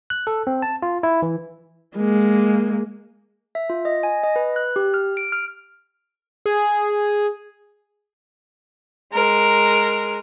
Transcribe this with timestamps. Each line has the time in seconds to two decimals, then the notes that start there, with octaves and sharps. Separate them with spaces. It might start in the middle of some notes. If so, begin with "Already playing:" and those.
0.10 F#6
0.27 A4
0.47 C4
0.62 A5
0.82 F4
1.03 E4
1.22 E3
1.96 G#3 A#3
3.55 E5
3.70 F4
3.85 D#5
4.03 G#5
4.24 D#5
4.36 B4
4.56 F#6
4.76 G4
4.94 F6
5.17 D7
5.32 F6
6.46 G#4
9.13 G#3 A#4